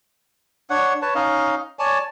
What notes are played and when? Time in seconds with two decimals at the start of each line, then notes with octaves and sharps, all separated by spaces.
0.70 D4 C#5 F#5
1.02 B4 C#5 A5
1.15 C#4 D#4 D#5 F5
1.79 C#5 D5 G#5 A5